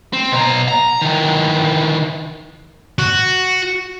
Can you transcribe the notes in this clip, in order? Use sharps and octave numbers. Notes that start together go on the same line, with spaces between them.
C4
B2 A#5
A#5
D#3 E3
F#4